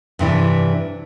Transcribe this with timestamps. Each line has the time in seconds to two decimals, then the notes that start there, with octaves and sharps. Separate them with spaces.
0.19 G2 C3 E3 D4